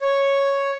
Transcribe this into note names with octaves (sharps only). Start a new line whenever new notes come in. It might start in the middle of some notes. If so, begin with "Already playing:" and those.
C#5